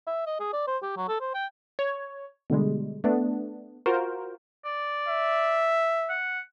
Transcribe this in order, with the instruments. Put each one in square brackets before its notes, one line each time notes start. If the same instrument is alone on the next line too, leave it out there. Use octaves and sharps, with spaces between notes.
[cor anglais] E5
D#5
G#4
D5
C5
G4
F#3
A4
C5
G5
[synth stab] C#5
B2 D3 G3 G#3
A3 B3 D4
F4 F#4 A#4 C5
[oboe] D5
[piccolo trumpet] E5
[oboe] F#5